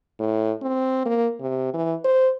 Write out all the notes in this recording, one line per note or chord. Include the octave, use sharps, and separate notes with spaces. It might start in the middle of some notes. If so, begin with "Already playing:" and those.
A2
C4
A#3
C3
E3
C5